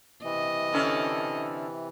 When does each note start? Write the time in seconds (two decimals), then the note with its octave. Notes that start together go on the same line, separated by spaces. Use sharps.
0.24 C3 E3 D#5
0.73 D3 C#4 A4